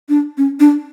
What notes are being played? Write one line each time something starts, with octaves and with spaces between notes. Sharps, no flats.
D4
C#4
D4